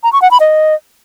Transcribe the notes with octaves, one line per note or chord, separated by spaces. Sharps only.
A#5
C#6
F#5
B5
D#5